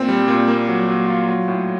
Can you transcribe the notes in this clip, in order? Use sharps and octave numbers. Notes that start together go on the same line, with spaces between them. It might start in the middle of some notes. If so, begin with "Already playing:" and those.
Already playing: A#2 C4
G3
A#2
A#3
F#3
F#3
F4
F#3
A2